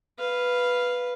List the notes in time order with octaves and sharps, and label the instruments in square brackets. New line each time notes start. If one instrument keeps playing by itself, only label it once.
[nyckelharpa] B4 F5